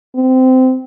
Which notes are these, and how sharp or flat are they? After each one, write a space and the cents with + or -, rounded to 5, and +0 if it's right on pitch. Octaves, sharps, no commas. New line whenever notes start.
C4 -20